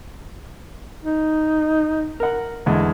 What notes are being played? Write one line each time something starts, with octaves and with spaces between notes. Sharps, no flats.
D#4
A#4 F#5
E2 D3 G#3